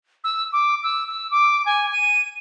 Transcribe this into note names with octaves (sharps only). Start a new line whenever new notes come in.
E6
D6
E6
E6
D6
G#5
D#7